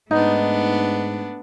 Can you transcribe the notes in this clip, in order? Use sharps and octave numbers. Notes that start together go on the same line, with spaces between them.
G#2 A3 B3 D4 D#4